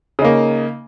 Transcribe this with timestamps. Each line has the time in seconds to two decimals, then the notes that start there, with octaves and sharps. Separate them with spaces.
0.19 C#3
0.22 D#4
0.25 A#3